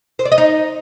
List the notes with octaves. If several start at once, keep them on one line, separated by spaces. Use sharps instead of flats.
C5
D5
D#5
D#4